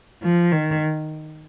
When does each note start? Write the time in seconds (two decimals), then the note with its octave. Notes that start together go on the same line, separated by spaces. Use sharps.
0.23 F3
0.52 D#3